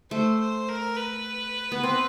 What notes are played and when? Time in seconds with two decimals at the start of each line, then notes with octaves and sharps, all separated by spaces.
0.11 A3 C5
0.40 C5
0.69 A#4
0.96 B4
1.72 B3
1.83 C4